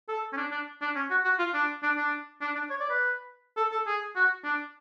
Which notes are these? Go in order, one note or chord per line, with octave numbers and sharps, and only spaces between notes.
A4
C#4
D4
D4
D4
C#4
F#4
F#4
F4
D4
D4
D4
D4
D4
C#5
D5
B4
A4
A4
G#4
F#4
D4